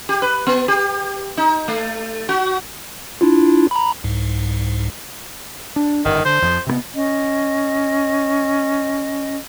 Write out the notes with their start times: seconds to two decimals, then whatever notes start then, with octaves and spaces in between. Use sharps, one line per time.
0.09 G4
0.22 B4
0.47 B3
0.68 G4
1.37 D#4
1.68 A3
2.29 F#4
3.21 D4 E4 F4
3.71 A#5 B5
4.04 C2 G#2
5.76 D4
6.05 G1 F#2 D#3
6.25 D3 C5
6.42 F2 F3
6.67 C3 F#3 B3
6.96 C#4 D#5